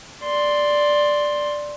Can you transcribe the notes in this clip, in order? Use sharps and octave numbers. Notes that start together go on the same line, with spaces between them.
D5 C6